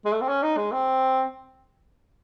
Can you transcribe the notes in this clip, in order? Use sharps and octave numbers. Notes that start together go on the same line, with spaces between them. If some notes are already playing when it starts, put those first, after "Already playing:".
G#3
A3
C4
C#4
D#4
G#3
C4